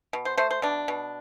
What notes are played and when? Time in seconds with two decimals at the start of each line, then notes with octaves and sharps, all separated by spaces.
0.13 B2
0.25 C5
0.37 A3 C5
0.51 C5
0.62 B2 D4
0.88 B2